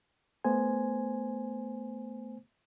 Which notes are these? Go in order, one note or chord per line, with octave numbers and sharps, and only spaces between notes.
A3 B3 C5 G#5